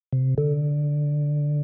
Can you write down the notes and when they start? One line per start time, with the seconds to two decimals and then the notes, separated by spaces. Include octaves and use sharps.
0.13 C3
0.38 D3